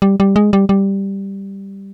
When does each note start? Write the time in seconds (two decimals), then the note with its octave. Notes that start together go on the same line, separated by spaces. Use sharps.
0.02 G3
0.20 G3
0.36 G#3
0.53 G3
0.69 G3